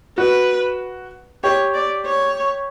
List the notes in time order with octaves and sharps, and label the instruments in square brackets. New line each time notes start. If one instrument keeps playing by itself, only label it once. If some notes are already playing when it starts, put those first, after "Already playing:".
[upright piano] F#4 [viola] B4
[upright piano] G4 [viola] C#5
[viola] D5
C#5